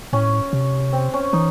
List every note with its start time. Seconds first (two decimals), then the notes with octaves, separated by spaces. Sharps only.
0.13 A2 C#4
0.53 C3
0.93 C4
1.14 C#4
1.33 E3 D#4